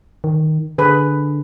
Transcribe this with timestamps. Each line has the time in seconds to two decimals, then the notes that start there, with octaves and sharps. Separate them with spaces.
0.24 D#3
0.78 D3 G#4 B4